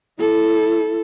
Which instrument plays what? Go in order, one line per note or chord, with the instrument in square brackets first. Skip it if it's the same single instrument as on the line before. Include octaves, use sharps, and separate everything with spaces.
[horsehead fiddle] E4 A4